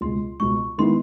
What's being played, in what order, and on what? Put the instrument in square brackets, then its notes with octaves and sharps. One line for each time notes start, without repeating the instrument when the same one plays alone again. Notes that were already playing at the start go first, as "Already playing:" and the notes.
[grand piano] C#2 B2 G#3 [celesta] C6
[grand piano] C#2 B2 G#3 [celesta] C#6
[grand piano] D#3 G#3 B3 E4 [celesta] C6